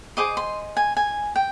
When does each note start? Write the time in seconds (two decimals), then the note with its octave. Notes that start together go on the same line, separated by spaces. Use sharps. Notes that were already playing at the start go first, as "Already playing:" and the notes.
0.17 G#4 C5 D#5 D6
0.37 C6
0.77 G#5
0.97 G#5
1.36 G5